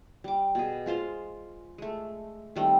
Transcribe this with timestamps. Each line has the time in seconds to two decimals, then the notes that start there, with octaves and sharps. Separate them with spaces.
0.24 G3 D6
0.55 B2 G#4
0.86 G#3 F4 C5 F5
1.78 G#3 A3
2.56 D#3 G3 A3 C4